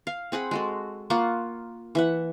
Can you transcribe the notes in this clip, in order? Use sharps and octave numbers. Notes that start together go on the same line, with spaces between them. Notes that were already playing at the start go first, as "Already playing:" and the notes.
F5
C4 G#4 F#5 B5
G#3 F#4 A4
A#3 F4 F#5 C#6
E3 E5 F#5